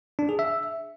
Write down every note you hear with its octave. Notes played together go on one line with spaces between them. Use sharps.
D4
G#4
E5